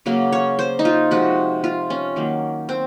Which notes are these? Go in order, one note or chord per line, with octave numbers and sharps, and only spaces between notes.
C#3 F#3 A#3
C#5
C5
D#4
F4
C3 F3 G#3 F#4
F4
C#4
D#3 F#3 A#3
C4